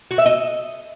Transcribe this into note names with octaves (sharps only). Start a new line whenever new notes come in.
F#4
E5
D#5